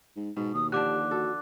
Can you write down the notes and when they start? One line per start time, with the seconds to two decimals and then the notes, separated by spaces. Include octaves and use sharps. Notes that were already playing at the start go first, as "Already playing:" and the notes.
0.16 G#2
0.36 G#2 B2
0.54 D#2 D#6
0.72 D3 F3 D4 G4 D6 F#6
1.11 F#4 A4